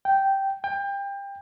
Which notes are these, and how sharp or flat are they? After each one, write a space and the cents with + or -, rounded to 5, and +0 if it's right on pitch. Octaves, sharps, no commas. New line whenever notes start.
G5 -10
G5 +25